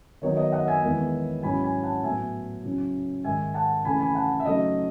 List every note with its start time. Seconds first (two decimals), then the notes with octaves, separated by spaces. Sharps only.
0.22 D#3 F#3 B3 D#4 C#5
0.37 D#5
0.52 D#5 F#5
0.67 E5 G#5
0.82 E2 D#3 G#3 B3 E4
1.43 G#2 F#3 C#4 E4 G#5 B5
1.63 G#5 B5
1.83 F#5 A5
2.04 A2 F#3 B3 E5 G#5
2.64 C#3 F#3 C#4 E4
3.24 G#2 D#3 G#3 E5 G#5
3.54 F#5 A5
3.85 C#3 E3 A3 G#5 B5
4.00 G#5 B5
4.15 F#5 A5
4.40 E5
4.45 C#3 F#3 A3 D#4 D#5